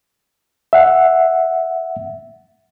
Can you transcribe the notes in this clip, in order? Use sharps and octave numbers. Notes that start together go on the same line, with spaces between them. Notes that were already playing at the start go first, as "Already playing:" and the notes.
E5 F#5